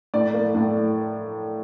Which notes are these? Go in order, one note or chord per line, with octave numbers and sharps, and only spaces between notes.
A2 D5
A#3
A2